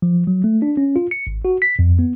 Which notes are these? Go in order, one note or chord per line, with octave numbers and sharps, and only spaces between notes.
F3
F#3
A3
D4
C#4
F4
C#7
G#1
F#4
B6
F2
B3